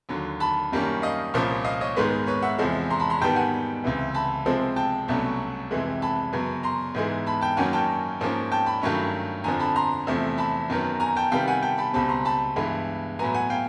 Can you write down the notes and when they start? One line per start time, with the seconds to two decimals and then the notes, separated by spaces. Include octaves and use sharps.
0.09 D#2 D3 F#3
0.40 A5 B5
0.72 F#2 D#3 G3 A#3 C#4
1.02 D#5 F5
1.34 C2 A#2 F3 A#3 C#4
1.64 D#5 F5
1.81 C#5 D#5
1.96 G#2 D#3 G#3 B3 B4
2.27 B4 C#5
2.42 E5 F#5
2.59 E2 C3 F3 G#3
2.90 A#5 C6
3.00 A5 B5
3.10 A#5 C6
3.21 G#2 D#3 G3 B3 G5 A5
3.36 F#5 G#5
3.84 C#2 C3 E3
4.14 A5 B5
4.46 C3 F3 G#3 C4
4.76 G5 A5
5.08 C2 B2 F#3 A3 C#4
5.71 F2 C3 E3 G#3
6.02 A5 B5
6.33 F#2 C#3 F#3 B3
6.63 A#5 C6
6.94 G#2 E3 G#3 B3
7.26 A5 B5
7.41 G5 A5
7.57 F#2 D#3 F#3 A#3 C#4 F#5 G#5
7.73 G5 A5
8.20 G#2 F3 A#3 C#4
8.52 G5 A5
8.66 A5 B5
8.82 G2 D#3 F#3 A3 C#4
9.44 F2 D3 F3 G#5 A#5
9.60 A5 B5
9.76 A#5 C6
10.07 E2 C3 F3 A3
10.38 A5 B5
10.69 F#2 D#3 F#3 B3
11.00 G#5 A#5
11.16 G5 A5
11.31 C3 D#3 G3 B3 F5 G5
11.48 F#5 G#5
11.62 G5 A5
11.78 A5 B5
11.93 C#2 B2 G3 C4 A5 B5
12.09 A#5 C6
12.25 A5 B5
12.56 G2 E3 G#3 B3
13.19 A2 F#3 B3 G#5 A#5
13.34 F#5 G#5
13.50 F5 G5